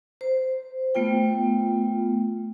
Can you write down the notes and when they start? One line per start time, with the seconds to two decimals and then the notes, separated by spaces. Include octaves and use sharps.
0.21 C5
0.95 A3 B3 F4 G5